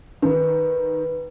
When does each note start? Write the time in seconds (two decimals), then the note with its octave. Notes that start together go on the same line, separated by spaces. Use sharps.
0.22 D#3 B4